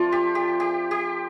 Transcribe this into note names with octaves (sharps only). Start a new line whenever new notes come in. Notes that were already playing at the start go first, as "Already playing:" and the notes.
Already playing: F3 A3 C4 F4 D5
G4
G4
G4
G4